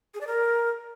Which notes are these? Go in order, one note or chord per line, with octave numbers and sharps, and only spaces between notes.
G#4
D5
A#4